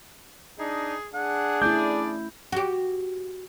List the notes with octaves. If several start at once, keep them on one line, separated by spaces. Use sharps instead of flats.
D4 D#4 G#4
D4 G#4 F#5
A3 C#4 E4 D5 G6
F#4 G4